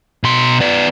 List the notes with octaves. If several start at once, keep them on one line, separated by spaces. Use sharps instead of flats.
B2 C6
B3 D5